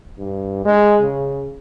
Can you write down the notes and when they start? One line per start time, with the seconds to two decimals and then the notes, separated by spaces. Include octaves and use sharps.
0.18 G2
0.65 G#3
1.01 C#3